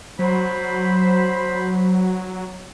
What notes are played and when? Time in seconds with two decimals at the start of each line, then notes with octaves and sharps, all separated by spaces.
0.19 F#3 C5 B5